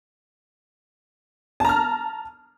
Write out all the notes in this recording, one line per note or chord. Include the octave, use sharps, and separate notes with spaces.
A5 A#5 F6